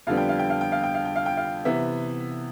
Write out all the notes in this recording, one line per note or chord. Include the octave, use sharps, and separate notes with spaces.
F2 D3 G3 B3 F5
G5
F5
G5
F5
G5
F5
G5
F5
G5
F5
G5
F5
C3 E3 B3 E5